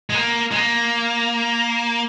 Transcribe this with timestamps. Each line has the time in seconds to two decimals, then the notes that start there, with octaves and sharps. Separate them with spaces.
0.10 G#3
0.15 A#3
0.51 G#3
0.56 A#3